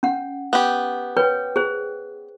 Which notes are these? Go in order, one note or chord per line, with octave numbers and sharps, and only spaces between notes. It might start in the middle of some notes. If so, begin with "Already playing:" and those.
C#4 F#5
B3 G4
B4 C#5 G5
G#4 C5